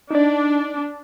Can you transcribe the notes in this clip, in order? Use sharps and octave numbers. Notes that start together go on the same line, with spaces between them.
D4 D#4 D5